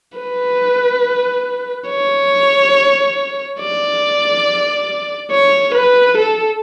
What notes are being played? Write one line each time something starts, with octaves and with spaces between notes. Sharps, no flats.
B4
C#5
D5
C#5
B4
A4